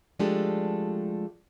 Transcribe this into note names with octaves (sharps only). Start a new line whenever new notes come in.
F3 G#3 A3 D4 G4 A4